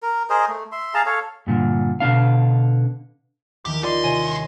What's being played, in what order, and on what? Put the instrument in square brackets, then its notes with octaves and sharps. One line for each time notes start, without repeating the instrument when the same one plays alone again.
[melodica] A#4
G#4 A#4 C5 D#5
A3
E5 C6
G#4 F5 A5 A#5
A4 C#5 F5
[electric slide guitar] G2 A#2 D3
B2 D3 D4 F5
[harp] D#2 D#3 E3 [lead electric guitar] G4
[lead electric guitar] C2 C6 [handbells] F4 D5 D#5
[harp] C3 [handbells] C#5 D#5 G#5